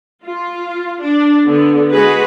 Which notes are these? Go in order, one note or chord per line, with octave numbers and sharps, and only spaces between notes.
F4
D4
D3 B3
G#3 F#4 G#4 B4